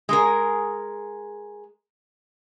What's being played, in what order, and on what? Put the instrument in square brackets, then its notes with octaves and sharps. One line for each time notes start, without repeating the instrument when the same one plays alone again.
[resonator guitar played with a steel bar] G#3 G#4 A#4